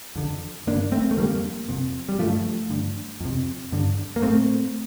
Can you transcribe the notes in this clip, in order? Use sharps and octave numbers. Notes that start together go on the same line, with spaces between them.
F2 D3
G2 D3 A#3 D4
A3 C4
A3
F2 D3 G3 A#3
F2 C3
G3
G2 D3 F3 A3
G2 D3
F2 C3
G2 D3
A#3
A2 A3 C4